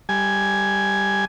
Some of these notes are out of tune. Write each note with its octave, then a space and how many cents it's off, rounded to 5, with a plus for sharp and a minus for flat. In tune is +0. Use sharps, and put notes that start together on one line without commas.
G3 +0 G#5 +5